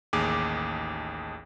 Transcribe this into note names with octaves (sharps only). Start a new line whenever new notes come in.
A1 D#2 G#4 D6